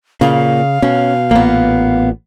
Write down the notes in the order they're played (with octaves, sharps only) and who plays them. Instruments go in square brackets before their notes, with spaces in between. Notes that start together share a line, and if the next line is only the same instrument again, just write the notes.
[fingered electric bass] A#2 [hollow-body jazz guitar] C#3 [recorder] F5
[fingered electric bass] B2 [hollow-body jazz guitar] C#4
[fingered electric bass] A1 A#2 [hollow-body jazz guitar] A#3 B3